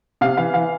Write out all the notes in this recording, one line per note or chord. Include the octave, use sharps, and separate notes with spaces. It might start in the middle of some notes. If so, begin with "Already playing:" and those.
C3 F5
E3 F5
E3 F5